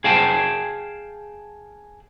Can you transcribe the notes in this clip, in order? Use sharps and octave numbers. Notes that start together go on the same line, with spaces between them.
G#4 F5 G5 A5